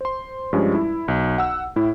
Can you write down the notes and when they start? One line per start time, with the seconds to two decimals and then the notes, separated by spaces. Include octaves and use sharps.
0.01 C5 C6
0.53 G2 F3 G3 G#3 C#4 F4
0.75 E4
1.08 B1
1.38 F#5 E6
1.76 A2 E4